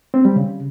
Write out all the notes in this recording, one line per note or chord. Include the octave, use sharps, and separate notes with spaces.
C4
G3
C#3